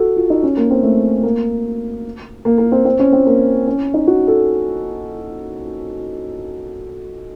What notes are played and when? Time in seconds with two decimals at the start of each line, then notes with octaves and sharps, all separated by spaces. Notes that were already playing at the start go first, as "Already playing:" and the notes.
Already playing: F#4 A4
0.16 F4
0.30 D#4
0.43 C#4
0.57 A#3
0.70 C4
0.83 A3
1.24 A#3
2.45 A#3
2.58 A#3
2.72 C4
2.85 C4
2.99 C#4
3.12 C4
3.26 A#3
3.67 C#4
3.94 D#4
4.07 F#4
4.27 A4